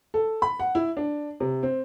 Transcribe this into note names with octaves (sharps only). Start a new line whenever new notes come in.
A4
B5
F#5
E4
D4
C3
C4